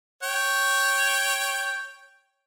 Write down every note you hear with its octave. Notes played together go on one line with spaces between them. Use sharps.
C#5 G5